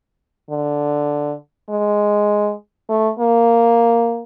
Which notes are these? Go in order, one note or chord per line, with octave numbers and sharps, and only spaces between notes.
D3
G#3
A3
A#3